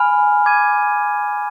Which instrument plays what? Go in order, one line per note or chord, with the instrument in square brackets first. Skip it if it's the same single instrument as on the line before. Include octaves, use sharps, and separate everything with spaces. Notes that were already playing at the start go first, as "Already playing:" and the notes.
Already playing: [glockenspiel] G#5 B5 F6
D6 G#6 D#7